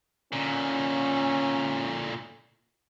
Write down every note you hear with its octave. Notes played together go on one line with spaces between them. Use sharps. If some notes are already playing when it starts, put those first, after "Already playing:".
A#2 D3 C#4